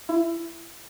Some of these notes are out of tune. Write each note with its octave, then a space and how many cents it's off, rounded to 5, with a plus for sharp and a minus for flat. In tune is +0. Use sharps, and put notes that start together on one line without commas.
E4 +25